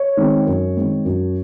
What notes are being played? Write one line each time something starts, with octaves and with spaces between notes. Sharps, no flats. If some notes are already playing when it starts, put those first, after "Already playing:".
Already playing: C#5
D#3 G#3 C4
F#2
D#3 G#3 C4
F#2